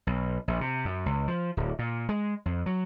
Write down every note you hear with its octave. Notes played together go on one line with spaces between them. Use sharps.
B1
A#1
C3
F#2
C#2
F3
D1
A#2
G#3
F2
F#3